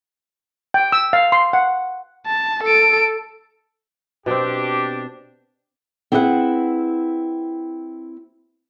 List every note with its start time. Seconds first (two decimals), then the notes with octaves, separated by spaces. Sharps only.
0.74 G5
0.92 E6
1.13 F5
1.32 C6
1.53 F#5
2.27 A5
2.64 A4 D7
4.26 B2 C4 D4 G4
6.12 C4 E4 G#4 B4 D#5 F#5